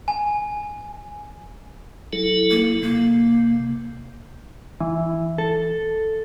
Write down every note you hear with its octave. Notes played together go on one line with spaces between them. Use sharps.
G#5
F#3 E4 A4
A#3
C3 A#3
E3
A4